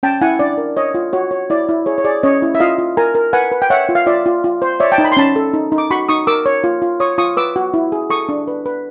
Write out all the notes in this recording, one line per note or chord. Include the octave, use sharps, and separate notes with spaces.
C#4 G5 A5
E4 F#5 G#5
D4 D5
A#4
C#5 D#5
F4
F#4 C#5
C#5
E4 D5
E4
G#4 C#5
C#5
G#4 D5
C#4 C#5 D#5
E4
E5
F4 D#5 F5
F4
A#4 G#5 A#5
A#4
B4 F#5 G#5
B4
G5
C#5 E5 F#5
F4
F5
F4 D5 E5
F4
F4
C5
C#5 D5 E5
G5 A5
D#4
B5
C6
C#4 A5 B5
A4
D#4
D#4
D6
F#4 B5 C#6
D#4 C#6 D#6
A#4 D6 E6
C#5
F4
F4
C#5 C#6 D#6
F4 C#6 D#6
B4 D6 E6
F#4
E4
G#4
A4 C#6 D#6
D4
B4
B4